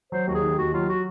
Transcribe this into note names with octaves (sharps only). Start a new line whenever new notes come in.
F#3 C5
D#2 F#4
G#4
D#3
D#2 F#4
F#3 F4
F#4